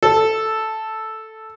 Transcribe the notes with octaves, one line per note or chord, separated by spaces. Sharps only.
A4